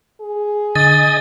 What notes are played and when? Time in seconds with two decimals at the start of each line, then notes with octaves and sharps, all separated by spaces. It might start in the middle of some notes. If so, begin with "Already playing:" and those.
0.21 G#4
0.75 D3 D#5 G#5 D#6 A6